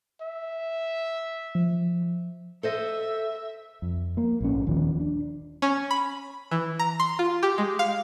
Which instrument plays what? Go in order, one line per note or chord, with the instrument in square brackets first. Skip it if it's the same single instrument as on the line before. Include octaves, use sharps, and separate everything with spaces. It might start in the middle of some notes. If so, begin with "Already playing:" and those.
[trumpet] E5
[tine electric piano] F3
[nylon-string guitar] A4 C5 D#5 [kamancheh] E5
[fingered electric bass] F2
A#3
A#1 G#2 C#4
D#1 D#3 F3
D4
[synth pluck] C#4
B5
E3
A#5
C6
F4
G4
G#3
F5